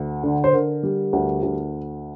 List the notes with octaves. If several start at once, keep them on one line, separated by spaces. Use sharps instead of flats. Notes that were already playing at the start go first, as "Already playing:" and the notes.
Already playing: D2
D3
C5
D3 A#4
G3
D2
D2